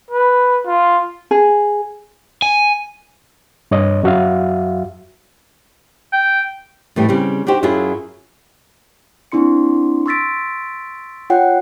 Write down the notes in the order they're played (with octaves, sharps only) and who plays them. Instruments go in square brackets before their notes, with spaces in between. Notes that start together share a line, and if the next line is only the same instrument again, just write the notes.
[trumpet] B4
F4
[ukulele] G#4
[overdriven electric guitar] G#5
[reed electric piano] G2 C#5 D#5
F#2 F#3 F#4 E5 F5
[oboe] G5
[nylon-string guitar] A2 E3 G3
C#3 G3 C4
D4 D#4 F#4 G4 C5
F#2 F#3 E4 F4 G#4
[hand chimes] A#3 C4 D4 E4 C6 C#7
C6 C#6 E6 A6 B6 D7
F4 C#5 F#5 G5